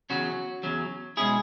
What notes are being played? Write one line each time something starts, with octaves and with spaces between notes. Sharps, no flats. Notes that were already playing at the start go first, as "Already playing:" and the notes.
E2 C#3 F#3 C#4 F#4
E2 C#3 F#3 C#4
B2 G#3 C#4 E4 G#4